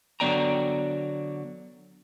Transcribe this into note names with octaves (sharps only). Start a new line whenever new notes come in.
D3 F#3 B3 D5 G5 A#5